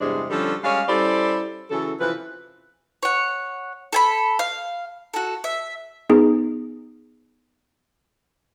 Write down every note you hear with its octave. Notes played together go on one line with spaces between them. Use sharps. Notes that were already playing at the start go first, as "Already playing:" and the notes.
E2 G2 C3 G#3 D4 G#4
D3 F3 G3 C#4 A4
G3 G#3 C#4 F5
G3 C#4 E4 A4 C5 D5
C#3 E3 F#3 A4
C3 E3 F3 B4
C#5 F#5
A4 G#5 B5
F5
F#4 A4
E5
B3 D#4 G#4